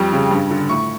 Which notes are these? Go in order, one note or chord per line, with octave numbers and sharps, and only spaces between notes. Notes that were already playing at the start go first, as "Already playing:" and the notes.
Already playing: F2 G3 C#6
C#3
G2
D3
A2 C#6